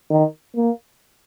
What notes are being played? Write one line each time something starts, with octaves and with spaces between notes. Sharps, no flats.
D#3
A#3